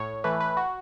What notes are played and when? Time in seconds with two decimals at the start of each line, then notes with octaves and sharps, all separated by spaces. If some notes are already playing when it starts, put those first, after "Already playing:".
Already playing: A2 C#5
0.24 E3 A3 B4
0.40 B4
0.57 F#4